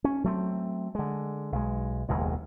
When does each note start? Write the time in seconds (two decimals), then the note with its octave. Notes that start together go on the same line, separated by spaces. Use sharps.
0.04 C#4
0.24 F#3 A3 C4
0.95 D3 G#3
1.52 B1 G#3
2.09 F#1 D#2 B2 G#3